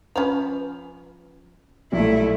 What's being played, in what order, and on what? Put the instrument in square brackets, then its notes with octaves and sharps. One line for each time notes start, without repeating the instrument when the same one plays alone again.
[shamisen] F3 C#4 B4 [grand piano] F7
[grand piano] B1 A#2 G3 [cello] A3 E4